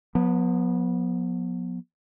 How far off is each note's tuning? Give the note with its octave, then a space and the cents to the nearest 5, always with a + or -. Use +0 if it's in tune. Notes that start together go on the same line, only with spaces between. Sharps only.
F3 +45 B3 -20